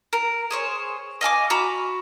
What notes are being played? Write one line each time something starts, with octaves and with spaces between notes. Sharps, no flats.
A#4
G#4 C5 C#5
D#5 F5 G#5 D6
F#4 A#5 B5 D6